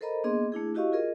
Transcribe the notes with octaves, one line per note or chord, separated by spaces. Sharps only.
A4 A#4 C5 D#5 A#5 B5
A#3 B3 D4 G#4 D#5 C6
A3 D4 E4 G#4
E4 F#4 G4 D#5 F5 C#6
F4 G#4 A#4 D#5